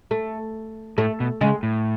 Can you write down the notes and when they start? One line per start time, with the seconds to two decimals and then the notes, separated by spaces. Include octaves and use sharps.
0.11 A3
0.98 A2 A3
1.20 B2
1.41 C#3 G#3
1.63 A2